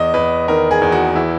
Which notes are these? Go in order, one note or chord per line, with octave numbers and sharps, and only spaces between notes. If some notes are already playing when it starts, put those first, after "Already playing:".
Already playing: E2 D#5
E2 B4
D#3 A#4
G#4
E2
F#4
E3 E4